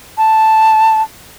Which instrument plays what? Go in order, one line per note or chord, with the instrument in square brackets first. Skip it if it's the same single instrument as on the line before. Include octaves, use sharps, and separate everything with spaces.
[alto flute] A5